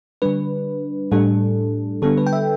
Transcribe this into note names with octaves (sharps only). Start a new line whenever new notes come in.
D3 G3 D4 B4
A2 G3 D4 A4
D3 G3 B3 D4 A4
B4
G5
E5